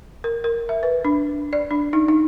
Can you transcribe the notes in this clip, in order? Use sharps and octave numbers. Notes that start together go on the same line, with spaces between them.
A#4
A#4
E5
B4
D4
D5
D4
D#4
D#4